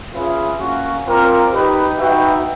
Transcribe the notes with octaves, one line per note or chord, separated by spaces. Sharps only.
C#4 F4 G#4 B4 E5
A#3 C#4 F#4
C4 F4 A#4 D5
D#4 G4 B4
D#4 F#4 B4 E5 G5